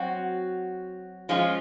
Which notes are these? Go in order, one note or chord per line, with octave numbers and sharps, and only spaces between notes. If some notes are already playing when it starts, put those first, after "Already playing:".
Already playing: F#3 C4 F#4
F3 G#3 C#4 F4